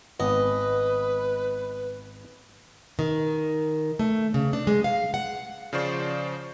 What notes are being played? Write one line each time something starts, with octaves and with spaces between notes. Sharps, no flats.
G#1 B3 B4 D#5
D#3
A3
C#3
D4
G#3
F5
F#5
C#3 F3 F4 C5 D5 C#6